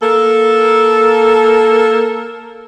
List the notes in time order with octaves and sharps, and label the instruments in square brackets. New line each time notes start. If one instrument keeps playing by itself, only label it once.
[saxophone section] A#3 A4